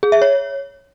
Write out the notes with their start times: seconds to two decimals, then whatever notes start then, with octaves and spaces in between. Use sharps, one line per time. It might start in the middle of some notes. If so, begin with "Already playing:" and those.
0.03 G#4
0.12 E5
0.22 C#5